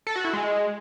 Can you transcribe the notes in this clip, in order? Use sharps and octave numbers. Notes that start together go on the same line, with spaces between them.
A4
F#4
E4
G#3